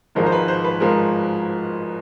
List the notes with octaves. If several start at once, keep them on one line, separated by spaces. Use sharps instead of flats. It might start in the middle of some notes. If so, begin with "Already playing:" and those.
G#1 G#2 F3 G#3 A#4
C5
B4
C5
B4
F3 G#3 A#4